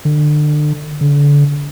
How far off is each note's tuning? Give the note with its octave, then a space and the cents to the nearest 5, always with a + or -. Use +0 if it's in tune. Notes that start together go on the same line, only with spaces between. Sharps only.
D3 +30
D3 -30